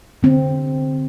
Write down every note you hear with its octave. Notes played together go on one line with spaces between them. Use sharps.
D3 C4